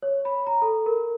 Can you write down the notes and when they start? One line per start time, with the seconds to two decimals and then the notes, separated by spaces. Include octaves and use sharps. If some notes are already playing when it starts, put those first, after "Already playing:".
0.02 C#5
0.25 B5
0.47 A#5
0.62 A4
0.86 A#4